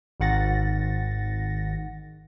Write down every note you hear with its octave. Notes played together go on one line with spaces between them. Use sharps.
G#1 G#2 D#3 F#5 A6 A#6